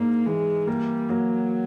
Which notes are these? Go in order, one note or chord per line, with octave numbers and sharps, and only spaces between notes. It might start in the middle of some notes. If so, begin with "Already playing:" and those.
Already playing: G#2 A#3 D4
E3 G#3
G3 A#3
F#3 A#3